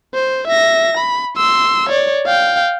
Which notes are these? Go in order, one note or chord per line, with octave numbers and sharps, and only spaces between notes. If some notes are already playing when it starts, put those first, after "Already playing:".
C5
E5 A#6
B5
C6 E6
C#5 D5
F5 G5